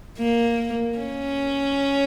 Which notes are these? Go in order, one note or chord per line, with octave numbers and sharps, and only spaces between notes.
A#3
C#4